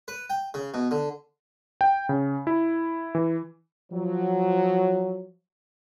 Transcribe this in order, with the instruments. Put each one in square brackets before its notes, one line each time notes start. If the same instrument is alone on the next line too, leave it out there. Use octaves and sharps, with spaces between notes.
[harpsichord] B4
G5
C#3
B2
D3
[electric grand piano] G5
C#3
E4
E3
[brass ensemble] F3 F#3